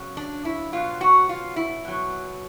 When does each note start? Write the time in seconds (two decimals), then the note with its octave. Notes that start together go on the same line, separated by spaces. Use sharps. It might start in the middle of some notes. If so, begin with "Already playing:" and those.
Already playing: C#3 F#3
0.17 D4
0.45 E4
0.72 B2 F#3 F4
1.01 F#4
1.29 F4
1.56 E4
1.85 B2 F#3